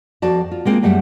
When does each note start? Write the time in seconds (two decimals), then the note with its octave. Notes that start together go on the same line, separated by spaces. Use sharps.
0.22 F2 F#4 D5 A5
0.51 F4
0.65 G#3 A#3 C4 F4
0.83 F#2 G3 A3 F#5